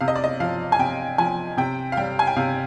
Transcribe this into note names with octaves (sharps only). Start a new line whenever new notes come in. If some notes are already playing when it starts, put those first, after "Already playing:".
C3 F5
D#5
D5
D#5
F3 F5
G#5
C3 G5
F3 G#5
C3 G5
F5
G3 G5
G#5
G5
C3 F5